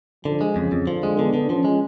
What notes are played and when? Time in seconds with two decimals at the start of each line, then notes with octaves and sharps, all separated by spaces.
0.25 D3 F3
0.41 G#3
0.56 F2 C#3
0.72 F2
0.87 D3 F3
1.03 G#3
1.18 D3 B3
1.34 D3
1.50 F3 C#4
1.65 G#3